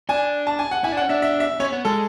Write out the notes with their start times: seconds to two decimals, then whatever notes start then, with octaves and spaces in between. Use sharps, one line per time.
0.09 D4 G#5
0.47 A5
0.59 G#5
0.71 F#5
0.84 E4 G#5
0.92 D4
0.97 F#5
1.01 C#4
1.09 D4 E5
1.22 E5
1.40 E5
1.60 C#4 C#5
1.73 B3
1.85 G#3 A4